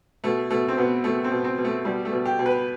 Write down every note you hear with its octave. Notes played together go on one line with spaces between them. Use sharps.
B2 A3
B2 A3
C4
B2 B3
B2 A3
C4
B2
C4
B2
A3
B2 G3
A3
B2
G4
B2
B4